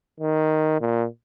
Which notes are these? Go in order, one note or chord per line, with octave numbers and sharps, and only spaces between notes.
D#3
A#2